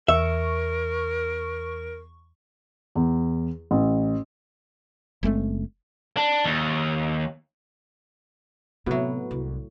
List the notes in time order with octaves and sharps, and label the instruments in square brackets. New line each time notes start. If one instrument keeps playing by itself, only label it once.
[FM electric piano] E2 C#6 [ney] A#4 [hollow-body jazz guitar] E5
[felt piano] E2
A1
[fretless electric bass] F#1 G#3 A3 C4
[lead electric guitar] D4
D#2
[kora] A2 F#3 [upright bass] C3 [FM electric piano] B3 F#4 B4
[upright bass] C2